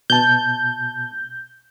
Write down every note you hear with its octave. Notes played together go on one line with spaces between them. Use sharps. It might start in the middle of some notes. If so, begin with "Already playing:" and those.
B2 A5 G6